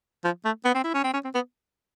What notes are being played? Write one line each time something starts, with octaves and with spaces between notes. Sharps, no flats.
F3
A3
B3
C4
E4
C#4
C4
C#4
C4
B3